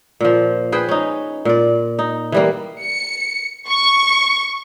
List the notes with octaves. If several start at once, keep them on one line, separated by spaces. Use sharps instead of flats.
A#2 F3
G#4 B4 C5 G5
C#4 D#4
A#2 D5
D#4
E3 G3 A#3
C#7
C#6